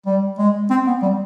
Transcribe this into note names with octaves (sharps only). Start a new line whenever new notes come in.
G3
G#3
C4
B3
G3